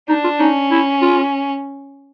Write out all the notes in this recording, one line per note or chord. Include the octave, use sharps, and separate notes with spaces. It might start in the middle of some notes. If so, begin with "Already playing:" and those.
D4 D#4
F4
C#4 D#4
E4
F4